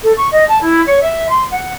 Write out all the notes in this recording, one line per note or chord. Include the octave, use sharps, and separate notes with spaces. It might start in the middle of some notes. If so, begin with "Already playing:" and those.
A4
C#6
D#5
A5
E4
C#5
E5
C6
F#5